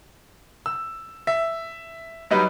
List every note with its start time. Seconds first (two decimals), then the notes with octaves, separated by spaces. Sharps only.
0.66 E6
1.27 E5
2.31 F#3 G3 D#4 B4